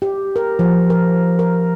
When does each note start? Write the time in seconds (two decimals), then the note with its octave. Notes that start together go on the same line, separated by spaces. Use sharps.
0.02 G4
0.36 A#4
0.59 F3
0.90 A#4
1.39 A#4